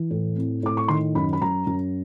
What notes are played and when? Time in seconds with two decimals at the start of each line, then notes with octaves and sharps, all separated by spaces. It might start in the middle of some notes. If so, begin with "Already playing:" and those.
Already playing: E3
0.11 A2
0.36 C4
0.63 A2 D6
0.77 C#6
0.88 D#3 C6
1.15 F#2 B5
1.33 B5
1.41 F#2 A#5
1.67 F#2